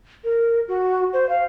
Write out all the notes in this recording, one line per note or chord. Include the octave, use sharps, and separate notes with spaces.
A#4
F#4
C5
F5